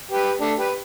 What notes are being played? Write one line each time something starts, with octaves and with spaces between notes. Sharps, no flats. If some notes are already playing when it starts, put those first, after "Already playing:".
G4 B4
A3 D4
G4 B4